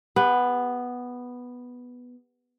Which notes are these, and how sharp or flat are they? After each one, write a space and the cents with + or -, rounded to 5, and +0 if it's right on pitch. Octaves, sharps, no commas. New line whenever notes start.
B3 +0 G4 +40